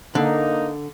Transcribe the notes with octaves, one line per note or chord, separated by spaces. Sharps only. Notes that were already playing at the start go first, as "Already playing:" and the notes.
D3 A#3 D#4